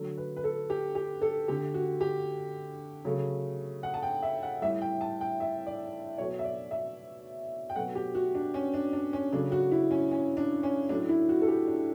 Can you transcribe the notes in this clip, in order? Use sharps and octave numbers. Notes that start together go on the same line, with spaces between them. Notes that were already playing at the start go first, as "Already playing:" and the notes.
Already playing: D3 F#3 A3
B4
B4
A4
G4
G4
A4
D3 A3 G4
F#4
G4
C#3 F#3 A3
F#5
A5
G5
E5
F#5
A2 G3 E5
G5
A5
G5
E5
D5
B2 F#3 A3 C#5
E5
D5
E5
G5
B2 F#3 A3 F#5
G4
F#4
D4
C#4
D4
D4
C#4
C#3 F#3 A3 D4
F#4
E4
C#4
C#4
D4
C#4
A2 F#3 A3 D4
E4
F#4
A4
G4
D4